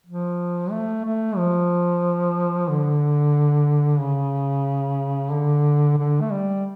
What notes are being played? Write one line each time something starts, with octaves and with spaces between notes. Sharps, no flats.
F3
A3
A3
F3
D3
C#3
D3
D3
A3
G3